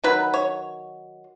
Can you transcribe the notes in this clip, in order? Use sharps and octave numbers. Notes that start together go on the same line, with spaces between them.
D#3 F#3 B4
C#5